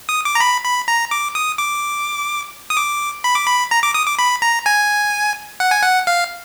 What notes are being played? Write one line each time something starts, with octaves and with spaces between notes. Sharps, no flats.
D#6
D6
A#5
B5
B5
A#5
D6
D#6
D6
D#6
D6
B5
D6
B5
A#5
D6
D#6
D6
B5
A#5
G#5
F#5
G#5
F#5
F5